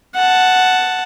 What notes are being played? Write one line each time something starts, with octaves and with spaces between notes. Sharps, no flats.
F#5 A5